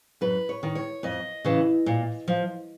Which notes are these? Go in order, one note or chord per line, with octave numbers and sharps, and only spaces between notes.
F#2 B4
C#5
D#3
C#5
F2 D#5
C#3 E3
A#2
F3